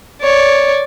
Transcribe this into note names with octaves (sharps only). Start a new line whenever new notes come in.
C#5 D5